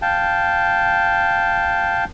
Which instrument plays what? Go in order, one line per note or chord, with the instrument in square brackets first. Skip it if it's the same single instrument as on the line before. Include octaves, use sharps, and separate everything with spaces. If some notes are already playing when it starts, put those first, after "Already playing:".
[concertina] F5 G5 A5